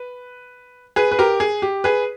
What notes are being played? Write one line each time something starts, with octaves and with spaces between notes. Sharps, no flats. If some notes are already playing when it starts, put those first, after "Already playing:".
Already playing: B4
G#4 B4
B4
G4 A#4
G#4
G4
G#4 B4